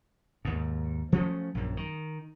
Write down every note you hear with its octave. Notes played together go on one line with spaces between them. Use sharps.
D#2 G#2
F3 F#3 A3 C#4
A#1 F#2
D#3